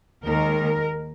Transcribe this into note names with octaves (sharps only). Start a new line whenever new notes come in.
D#2 D#3 G#3 A#4